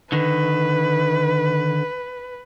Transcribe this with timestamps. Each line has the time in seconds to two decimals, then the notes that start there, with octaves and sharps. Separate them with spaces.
0.12 D3 D#3 B4